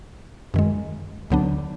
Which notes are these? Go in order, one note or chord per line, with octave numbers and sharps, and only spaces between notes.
F#2 D#3 G#3
D2 D3 F#3 B3 D4